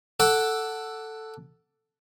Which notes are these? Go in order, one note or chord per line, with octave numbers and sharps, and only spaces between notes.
A4 F#5 D6